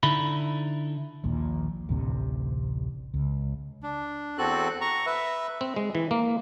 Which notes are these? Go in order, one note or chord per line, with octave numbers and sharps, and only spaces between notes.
D3 D#4 E4 A4 B5
A#1 D#2 A#2
A1 D2 C3
C#2
D4
E2 C4 F#4 A4 F#6
A#5 C#6
B4 E5
C4
G#3
E3
A#3